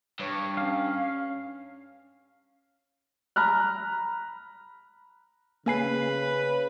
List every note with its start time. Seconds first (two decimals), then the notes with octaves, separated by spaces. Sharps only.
0.20 G2 C#5
0.57 C#4 F5
3.36 A#5 B5 F6 F#6
5.66 C#3 A#3 B4 G#5 C7